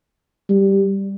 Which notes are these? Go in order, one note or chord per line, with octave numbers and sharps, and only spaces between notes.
G3